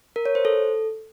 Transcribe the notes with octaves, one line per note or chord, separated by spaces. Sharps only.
A#4
C#5
C5
A4